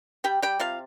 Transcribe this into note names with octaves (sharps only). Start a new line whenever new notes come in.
G3 G4 G5
G3 G4 G5
C3 F4 F5